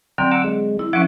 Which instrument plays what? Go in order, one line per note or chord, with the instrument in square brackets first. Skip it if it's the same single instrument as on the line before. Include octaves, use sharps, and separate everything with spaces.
[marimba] D3 F#3 C4 [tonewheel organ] G5 A#5
[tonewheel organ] F#5 D6 E6
G#3
[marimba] E4
[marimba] F3 C#4 [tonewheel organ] E5 F#5 D6